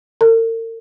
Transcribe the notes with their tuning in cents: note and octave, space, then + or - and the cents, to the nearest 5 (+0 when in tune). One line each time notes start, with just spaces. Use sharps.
A#4 -45